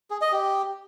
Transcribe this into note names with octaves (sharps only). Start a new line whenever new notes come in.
G#4
D#5
G4